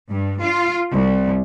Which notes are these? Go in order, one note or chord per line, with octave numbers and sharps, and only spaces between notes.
G2
F4
C2